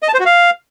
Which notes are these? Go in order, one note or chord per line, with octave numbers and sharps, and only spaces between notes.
D#5
A5
C5
F#4
F5